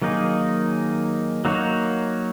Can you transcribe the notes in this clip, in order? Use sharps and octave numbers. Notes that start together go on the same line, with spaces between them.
D#3 F#3 A#3 D#4 G#4
F#3 A#3 D#4 F#4 C#5